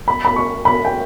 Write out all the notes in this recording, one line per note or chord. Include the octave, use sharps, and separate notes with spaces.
B5
B5
C#6
B5
G5